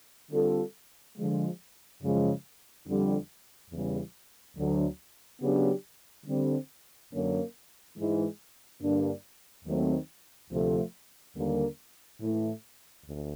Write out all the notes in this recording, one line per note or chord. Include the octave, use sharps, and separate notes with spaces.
D3 G3 C4 F4 A4
D3 F3 G#3
F#2 C#3 F3 G#3
F2 D3 G3
E2 C#3 E3 G3
D2 D3 F#3
C#3 F#3 B3 D4 G4
D3 G3 C4
F#2 D3 F#3 A#3 C#4
G#2 E3 G#3
G2 D3 G3 A#3 D4
D#2 D#3 F#3 A3 C4
D2 C3 F3 A3
D#2 D3 G3 A#3
A2 E3 A3
D2